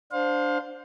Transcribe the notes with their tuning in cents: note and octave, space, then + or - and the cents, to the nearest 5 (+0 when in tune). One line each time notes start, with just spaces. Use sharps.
D4 +0 C5 -5 F5 +30